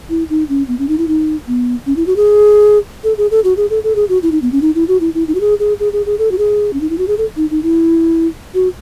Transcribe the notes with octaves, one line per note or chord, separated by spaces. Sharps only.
E4
D#4
C#4
B3
C#4
D#4
E4
D#4
B3
C#4
E4
F#4
G#4
A4
G#4
A4
F#4
G#4
A4
A4
G#4
F#4
E4
D#4
B3
C#4
D#4
E4
F#4
E4
E4
D#4
F#4
G#4
G#4
G#4
G#4
G#4
A4
F#4
G#4
C#4
D#4
E4
F#4
G#4
A4
D#4
D#4
E4
F#4